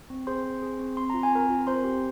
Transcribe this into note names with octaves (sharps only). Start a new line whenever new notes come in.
C4
G#4 C5 C6
C4
G#4
C4
C4 C6
F4 A#5
G#5
C4 A#4 A#5
F4
C4 C5 C6
G4